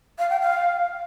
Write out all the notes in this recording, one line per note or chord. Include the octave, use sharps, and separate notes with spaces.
F5
G5
F5